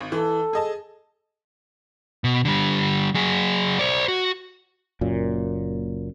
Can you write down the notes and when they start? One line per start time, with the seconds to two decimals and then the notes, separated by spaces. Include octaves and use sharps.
0.01 G#1
0.12 E3 A4
0.53 G#4 D#5 A5
2.24 B2
2.45 D3 G3
3.15 F#3 G#4
3.79 C5 D5
4.08 F#4
5.01 F#1 F#2 A#2